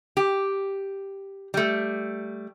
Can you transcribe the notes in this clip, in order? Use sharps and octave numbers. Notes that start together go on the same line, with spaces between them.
G4
G3 A3